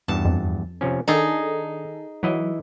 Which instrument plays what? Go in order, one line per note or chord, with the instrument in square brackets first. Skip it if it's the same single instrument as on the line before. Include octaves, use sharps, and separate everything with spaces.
[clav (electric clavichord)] E2 G2 [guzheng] A5
[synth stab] F2
[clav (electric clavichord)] C3 F3 C#4
[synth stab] D#3 A4 [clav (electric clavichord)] D4 [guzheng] D#4 G#4
[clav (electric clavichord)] E3 E4 D#5 [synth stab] F#3